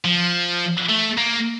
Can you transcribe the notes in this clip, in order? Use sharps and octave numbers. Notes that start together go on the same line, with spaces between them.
F3
A3
A#3